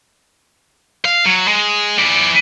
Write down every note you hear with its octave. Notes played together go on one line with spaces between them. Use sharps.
F5
F#3
G#3
E3 D5